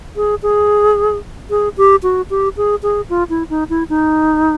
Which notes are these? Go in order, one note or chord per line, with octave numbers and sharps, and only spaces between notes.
G#4
G#4
G#4
G4
F#4
G4
G#4
G#4
F4
E4
D#4
E4
D#4